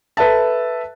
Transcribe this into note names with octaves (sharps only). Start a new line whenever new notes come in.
A4 B4 E5 A5